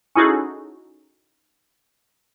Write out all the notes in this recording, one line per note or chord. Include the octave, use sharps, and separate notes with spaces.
C#4 D#4 E4 F#4 G#4 A4